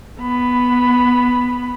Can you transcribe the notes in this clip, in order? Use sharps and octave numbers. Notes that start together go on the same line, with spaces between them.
B3 B5